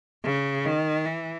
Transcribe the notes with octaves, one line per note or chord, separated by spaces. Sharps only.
C#3
D#3
E3